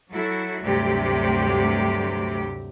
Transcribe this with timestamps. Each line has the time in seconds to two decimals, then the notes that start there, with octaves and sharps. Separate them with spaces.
0.12 F#3 E4 F#4 A4
0.61 D2 G2 C3 F#3 G4